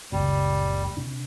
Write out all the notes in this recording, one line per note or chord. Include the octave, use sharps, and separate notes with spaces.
F#1 C#2 A#2 G3
C3 D4